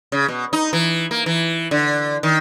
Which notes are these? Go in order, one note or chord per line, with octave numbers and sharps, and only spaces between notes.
C#3
B2
D#4
E3
A#3
E3
D3
D#3